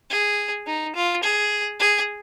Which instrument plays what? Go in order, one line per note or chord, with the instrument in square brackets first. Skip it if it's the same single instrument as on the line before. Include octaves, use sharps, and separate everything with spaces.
[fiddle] G#4
D#4
F4
G#4
G#4